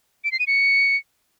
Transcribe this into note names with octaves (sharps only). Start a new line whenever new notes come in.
D7
C7
D#7
C#7